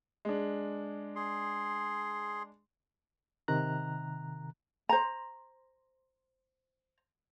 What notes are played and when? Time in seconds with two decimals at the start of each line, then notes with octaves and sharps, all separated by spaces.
0.25 G#3 D4
1.16 G#4 C6
3.48 C3 D#3 A#5 F#6
4.89 C5 A#5